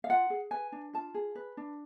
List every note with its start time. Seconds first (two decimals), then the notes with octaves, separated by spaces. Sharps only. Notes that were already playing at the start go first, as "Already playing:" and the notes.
0.04 F5
0.09 F4 F#5
0.30 G#4
0.51 B4 G#5
0.72 D4
0.93 F4 A5
1.14 G#4
1.35 B4
1.57 D4